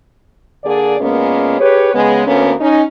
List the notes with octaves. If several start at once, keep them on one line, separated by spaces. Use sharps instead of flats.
D3 A#3 G#4 D5
A#2 G#3 A#3 B3 C#4
G4 G#4 B4 C#5
C#3 G#3 B3
D2 D3 A#3 B3 C#4
C#4 D#4